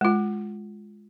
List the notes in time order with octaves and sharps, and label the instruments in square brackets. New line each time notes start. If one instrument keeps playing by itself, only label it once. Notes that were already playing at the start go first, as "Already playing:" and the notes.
[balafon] G#3 F4